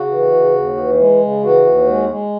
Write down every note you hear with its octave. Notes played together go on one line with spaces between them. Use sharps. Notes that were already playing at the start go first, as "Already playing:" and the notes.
Already playing: C#3 F#4
E3
C#3
D#2
E3
G#3
C#3
E3 F#4
D#2
G#3
G#3